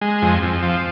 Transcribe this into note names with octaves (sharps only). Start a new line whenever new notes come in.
G#3
F2
F2
F3